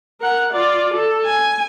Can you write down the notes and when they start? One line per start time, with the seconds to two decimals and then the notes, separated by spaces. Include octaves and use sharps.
0.21 A#4 F#5
0.52 F4 D5
0.94 A4
1.25 G#5